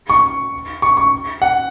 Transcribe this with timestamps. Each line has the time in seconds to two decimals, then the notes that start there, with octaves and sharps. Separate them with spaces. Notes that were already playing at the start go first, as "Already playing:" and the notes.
0.10 C#6
0.82 C#6
0.97 C#6
1.42 F#5